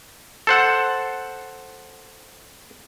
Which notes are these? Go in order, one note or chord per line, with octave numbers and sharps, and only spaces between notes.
A4 C5 F#5